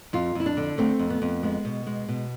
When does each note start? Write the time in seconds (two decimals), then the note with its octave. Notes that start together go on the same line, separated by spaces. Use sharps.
0.13 F2 F4
0.35 F2 E4
0.46 D4
0.57 D3
0.78 A3 C4
0.99 F2
1.10 B3
1.22 F2
1.43 G#3 B3
1.65 B2
1.87 G#3
2.09 B2